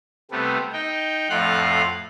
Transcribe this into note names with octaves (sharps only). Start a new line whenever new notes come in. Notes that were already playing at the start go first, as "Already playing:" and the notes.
C3 G3 A3 B3
D#4 G5
F2 A2 F4 F5 F#5 F#6